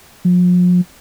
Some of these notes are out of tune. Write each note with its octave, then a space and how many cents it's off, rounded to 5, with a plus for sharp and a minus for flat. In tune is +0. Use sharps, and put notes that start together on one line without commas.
F3 +40